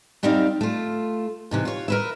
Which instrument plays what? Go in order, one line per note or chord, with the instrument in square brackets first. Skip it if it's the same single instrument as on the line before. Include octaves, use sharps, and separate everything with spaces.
[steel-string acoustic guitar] F#2 G3 C4 D#4 D5 F5
A3 F4
G#2 C3 E3
F4 C#5
A#4 B4 E5